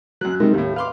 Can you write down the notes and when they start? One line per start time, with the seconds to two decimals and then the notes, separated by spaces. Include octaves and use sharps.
0.21 F#2 F#3 F#6
0.40 C3 G3 G#3 D#4 A#4
0.54 D#2 A2 G4
0.76 B4 F5 C6 D6